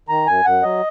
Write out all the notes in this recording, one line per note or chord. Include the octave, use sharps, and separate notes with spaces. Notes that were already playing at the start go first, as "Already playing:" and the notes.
D#3 A#5
F#2 G#5
F#2 F#5
F#3 D#5